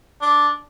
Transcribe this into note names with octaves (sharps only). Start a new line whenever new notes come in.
D4